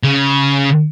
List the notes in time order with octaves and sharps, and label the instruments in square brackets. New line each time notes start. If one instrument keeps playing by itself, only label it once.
[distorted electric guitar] C#3